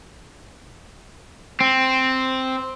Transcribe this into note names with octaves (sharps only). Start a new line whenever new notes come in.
C4